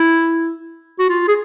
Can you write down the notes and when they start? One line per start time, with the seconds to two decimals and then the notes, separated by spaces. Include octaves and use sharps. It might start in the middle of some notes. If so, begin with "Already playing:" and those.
Already playing: E4
0.99 F#4
1.09 F4
1.28 G#4